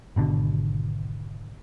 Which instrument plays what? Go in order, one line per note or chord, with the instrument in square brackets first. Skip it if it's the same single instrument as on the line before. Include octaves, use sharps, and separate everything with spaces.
[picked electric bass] G#1 B2 D3